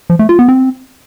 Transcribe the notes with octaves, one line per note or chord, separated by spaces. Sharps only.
F3
A3
F4
B3
C4